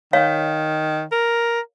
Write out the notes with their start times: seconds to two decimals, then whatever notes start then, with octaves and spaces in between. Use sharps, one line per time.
0.13 D#3 C#5 F5
1.12 A#4